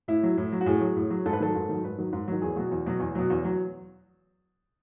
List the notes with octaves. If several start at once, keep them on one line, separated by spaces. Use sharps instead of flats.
A2 E4
F#3
A2
F#3
F#4
A2 G#4
F#3
A2
F#3
G#2 A4
B4
D#3 F#3 A4
G#2
D#3 F#3
G#2 B4
D#3 F#3
G#2
D#3 F#3
E2 G#4
B2 F#3 F#4
E2
B2 F#3
E2
B2 F#3
E2
F#3